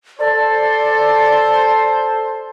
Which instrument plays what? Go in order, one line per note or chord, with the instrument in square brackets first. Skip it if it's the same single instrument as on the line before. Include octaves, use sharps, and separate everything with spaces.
[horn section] A4 C5 [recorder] D5